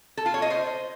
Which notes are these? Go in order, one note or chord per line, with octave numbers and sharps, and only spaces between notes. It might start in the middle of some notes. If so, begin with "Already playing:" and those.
A4
F4
C#5
D#5
C5